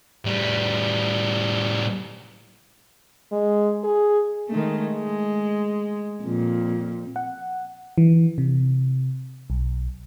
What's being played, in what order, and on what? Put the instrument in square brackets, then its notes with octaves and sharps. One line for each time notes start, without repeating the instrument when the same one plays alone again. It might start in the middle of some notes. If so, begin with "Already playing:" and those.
[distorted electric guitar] A2 G3
[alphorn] G#3
G#4
[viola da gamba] D#3 G#3 A3
G#3
F2 A#2
[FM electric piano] F#5
E3
C3
B1